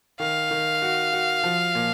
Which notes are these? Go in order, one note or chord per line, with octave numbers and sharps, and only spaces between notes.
D#3 F5
D#3
F#4
F#4
F3
A#2